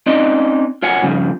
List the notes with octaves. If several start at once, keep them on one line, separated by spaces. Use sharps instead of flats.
C4 C#4 D#4 D5 D#5
F4 C#5 F#5 G#5
G2 C#3 F3